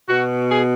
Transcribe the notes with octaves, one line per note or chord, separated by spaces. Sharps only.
B2 F#4
G#4